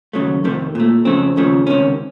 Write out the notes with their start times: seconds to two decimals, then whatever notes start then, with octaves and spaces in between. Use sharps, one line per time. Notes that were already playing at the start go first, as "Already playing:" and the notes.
0.13 D#2 C#3 F#3 A3
0.44 F2 C3 D#3 A3
0.75 A#2 A3
1.05 F2 C#3 A3 C4
1.36 D#2 C#3 F3 A3
1.67 C#2 C3 D#3 C#4